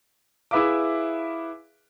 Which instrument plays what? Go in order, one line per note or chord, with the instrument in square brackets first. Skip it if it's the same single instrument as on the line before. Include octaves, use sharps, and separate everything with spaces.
[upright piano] E4 G#4 B4 E5 F5 D6